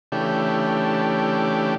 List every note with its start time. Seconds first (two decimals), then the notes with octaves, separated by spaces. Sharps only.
0.12 C#3 E3 A3 D4 G4